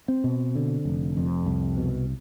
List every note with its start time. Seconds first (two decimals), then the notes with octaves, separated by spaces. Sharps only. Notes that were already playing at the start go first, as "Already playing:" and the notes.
0.08 C4
0.24 B2
0.55 D3
0.85 F1
1.17 F2
1.46 C2
1.77 B2